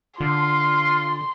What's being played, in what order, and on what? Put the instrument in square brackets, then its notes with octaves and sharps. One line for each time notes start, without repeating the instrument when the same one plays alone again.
[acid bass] D3 [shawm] F4 [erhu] C6